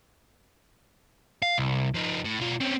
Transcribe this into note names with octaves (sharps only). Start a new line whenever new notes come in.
F5
C2
F3 D#4
A2
B2 F4
C4 C#4